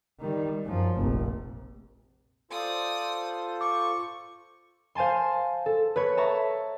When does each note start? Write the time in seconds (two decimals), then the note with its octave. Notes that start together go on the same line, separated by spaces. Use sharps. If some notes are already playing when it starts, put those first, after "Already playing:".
0.19 D#3 G3
0.65 F#2 F3
0.96 F1 A#1
2.51 F4 A4 C5 D5 D#6
3.61 C#6 D6
4.95 C5 F5 G#5 A5 C6
5.66 A4
5.96 B4 C#5
6.17 E5 A5 A#5 C#6